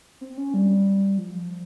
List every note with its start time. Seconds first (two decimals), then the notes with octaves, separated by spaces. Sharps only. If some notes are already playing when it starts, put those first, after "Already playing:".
0.21 C4
0.38 C#4
0.54 G3
1.18 F3